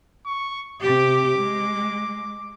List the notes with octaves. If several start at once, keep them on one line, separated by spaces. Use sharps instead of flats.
C#6
C3 G4 D6
G#3